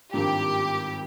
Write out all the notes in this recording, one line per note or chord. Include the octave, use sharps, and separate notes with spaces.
G#1 G2 F3 A#3 G4